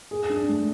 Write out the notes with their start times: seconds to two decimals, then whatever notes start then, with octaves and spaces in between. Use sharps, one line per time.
0.11 G#4
0.30 D4
0.49 A3